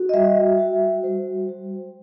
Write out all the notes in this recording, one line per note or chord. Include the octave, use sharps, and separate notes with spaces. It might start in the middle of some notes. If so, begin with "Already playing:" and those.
Already playing: F#4
D#5
G3 E5
F#4
G3 C5
G3